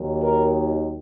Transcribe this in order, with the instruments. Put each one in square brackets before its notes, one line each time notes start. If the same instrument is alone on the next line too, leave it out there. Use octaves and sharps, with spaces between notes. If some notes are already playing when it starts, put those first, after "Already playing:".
Already playing: [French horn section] D#2 D#3 F#3
A#4